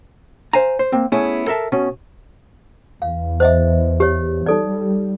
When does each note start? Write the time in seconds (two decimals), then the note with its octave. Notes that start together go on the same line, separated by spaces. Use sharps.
0.53 C5 F5 G#5 A#5
0.79 C5
0.92 A#3 C4
1.12 A3 B3 C#4 E4 G#4
1.47 A4 A#4 E5 A5
1.72 B2 C#4
3.02 E2 F5
3.40 C5 D#5 E5
4.00 G4 C#5
4.46 G3 D#4 A4 D5